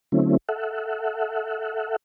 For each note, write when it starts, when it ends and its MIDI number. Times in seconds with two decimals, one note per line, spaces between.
0.12 0.37 50
0.12 0.37 54
0.12 0.37 57
0.12 0.37 60
0.12 0.37 61
0.12 0.37 64
0.49 1.96 69
0.49 1.96 76
0.49 1.96 78